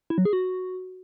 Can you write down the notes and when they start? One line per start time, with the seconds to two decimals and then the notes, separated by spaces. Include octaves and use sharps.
0.10 E4
0.18 F#3
0.25 G#4
0.33 F#4